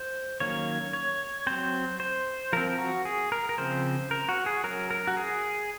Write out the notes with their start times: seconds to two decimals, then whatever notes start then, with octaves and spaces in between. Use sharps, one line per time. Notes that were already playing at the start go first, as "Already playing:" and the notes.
Already playing: C5
0.40 D#3 F#3 A#3 C#4 C#5
0.93 C#5
1.47 F#3 C4 C5
2.00 C5
2.53 F3 C4 A#4
2.79 F#4
3.05 G#4
3.32 A#4
3.49 A#4
3.58 C#3 F3 C4 C5
4.11 A#4
4.29 F#4
4.46 G#4
4.64 F#3 C#4 A#4
4.91 A#4
5.07 F#4
5.17 G#4